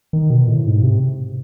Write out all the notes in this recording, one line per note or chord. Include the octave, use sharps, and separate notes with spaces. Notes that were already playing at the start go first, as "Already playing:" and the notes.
D#3
B2
A2
G#2
C3